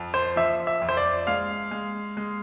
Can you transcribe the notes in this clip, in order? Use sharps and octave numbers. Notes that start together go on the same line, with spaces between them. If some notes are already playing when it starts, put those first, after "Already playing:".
Already playing: F2
C5
F3 E5
E5
F2
C5
D5
G#3 F5
G#3
G#3